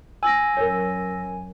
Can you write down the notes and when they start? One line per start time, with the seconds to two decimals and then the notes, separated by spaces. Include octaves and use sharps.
0.23 G#5 E6 A#6
0.57 F#2 A#4 C#5